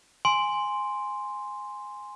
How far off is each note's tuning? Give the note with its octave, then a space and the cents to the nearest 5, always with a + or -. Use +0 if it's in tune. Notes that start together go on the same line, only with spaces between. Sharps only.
G#5 -5 C6 +0